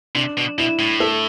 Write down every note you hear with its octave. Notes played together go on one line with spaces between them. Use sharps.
C3 D4
B2
B2 E4
A2
A4